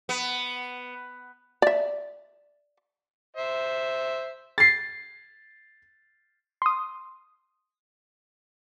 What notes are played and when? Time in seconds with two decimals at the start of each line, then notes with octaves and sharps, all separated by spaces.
0.09 B3
1.62 D5 E5
3.37 C5 E5
4.58 A6 C7
6.62 C6 D#6